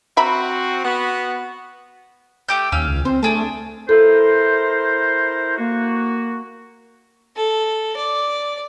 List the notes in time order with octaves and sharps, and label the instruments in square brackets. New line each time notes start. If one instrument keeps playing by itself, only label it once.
[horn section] C4 F#4 [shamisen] E5 A#5 B5
[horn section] B3 F#4
[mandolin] A3 G4 G6
[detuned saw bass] D#2 [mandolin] C#4 F5 E6
[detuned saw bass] C#2
[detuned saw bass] C4 [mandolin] C5
[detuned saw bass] A3 [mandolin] D4 G#4 A5
[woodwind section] E4 A#4 C5 [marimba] A4
[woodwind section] A#3 F#4
[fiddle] A4
D5